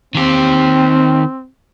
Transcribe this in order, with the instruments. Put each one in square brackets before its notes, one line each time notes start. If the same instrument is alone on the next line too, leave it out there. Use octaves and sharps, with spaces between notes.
[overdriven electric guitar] D#3 G4 [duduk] C4